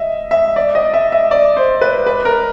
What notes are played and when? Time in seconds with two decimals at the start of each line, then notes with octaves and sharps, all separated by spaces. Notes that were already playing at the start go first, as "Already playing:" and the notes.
Already playing: D#5 E5
0.31 E5
0.56 D5
0.75 D#5
0.94 E5
1.12 E5
1.31 D5
1.57 C5
1.81 B4
2.07 B4
2.25 A#4